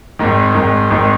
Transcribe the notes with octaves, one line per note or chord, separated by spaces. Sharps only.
G#1 G#2 D#3
G#1 G#2 D#3
G#1 G#2 D#3